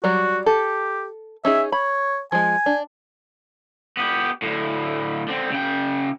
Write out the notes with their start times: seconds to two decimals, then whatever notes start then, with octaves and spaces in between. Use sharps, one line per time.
0.04 F#3 G3 F#4 D5
0.46 G4 A4
1.45 C#4 D#4 G#4 E5
1.72 C#5 B5
2.32 F3 G#3 G#5
2.66 D4
3.97 B3 G4
4.42 D2 A2
5.28 D3 C4
5.51 C#3 G5